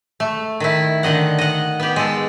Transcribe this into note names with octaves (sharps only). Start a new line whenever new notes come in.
A3
D#3 E4
D3 D#3 D#5 F#5
D#5 F#5
B3 G4
G#3 A4